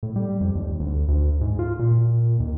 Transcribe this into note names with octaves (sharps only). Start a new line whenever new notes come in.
A2
G3
F2
D#2
D2
D2
G#2
F4
A#2
D#2